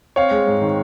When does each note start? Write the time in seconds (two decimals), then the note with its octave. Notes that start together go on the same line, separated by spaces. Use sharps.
0.16 C4 C#5 F5
0.31 G#3
0.47 G#2
0.62 D#3